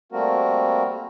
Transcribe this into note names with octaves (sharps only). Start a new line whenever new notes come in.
G3 A3 A#3 C4 F#4 A#4